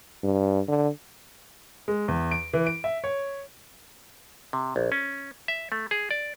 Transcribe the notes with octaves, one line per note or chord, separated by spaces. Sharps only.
G2
D3
G#3
E2
D7
E3
D7
E5
C#5
C3
A#1
C#4
E5
A3
G#4
D5